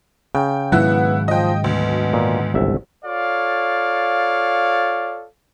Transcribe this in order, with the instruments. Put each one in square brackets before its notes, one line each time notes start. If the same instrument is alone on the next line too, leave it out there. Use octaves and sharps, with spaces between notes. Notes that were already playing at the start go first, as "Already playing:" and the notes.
[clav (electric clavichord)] C#3 [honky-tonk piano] G5
[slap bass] G#2 D#3 F#3 [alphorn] B3 [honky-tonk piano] E4 F#5
[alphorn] F3 [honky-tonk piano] D#5 G5
[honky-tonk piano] D2 [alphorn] B2
[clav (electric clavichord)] A#2
G1 C2 E5
[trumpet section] F4 A4 C#5 D5 F5